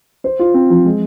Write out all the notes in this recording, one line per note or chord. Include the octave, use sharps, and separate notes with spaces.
C5
F4
C4
F3
G#3